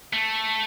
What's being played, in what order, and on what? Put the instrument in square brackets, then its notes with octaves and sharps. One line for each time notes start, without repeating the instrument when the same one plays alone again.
[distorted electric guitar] A3